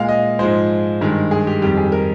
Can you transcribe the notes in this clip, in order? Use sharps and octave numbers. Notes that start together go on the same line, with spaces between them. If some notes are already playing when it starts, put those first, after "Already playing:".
Already playing: A#2 G#3 F5
D#5
G#2 F3 G#3 C5
G2 D#3 G#3
G#4
G4
F2 D#3 G3 G4
G#4
A#4